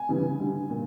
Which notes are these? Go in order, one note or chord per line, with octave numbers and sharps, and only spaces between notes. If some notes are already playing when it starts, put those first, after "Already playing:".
Already playing: G#5
C#3 E3 G3
D3 G3
A#2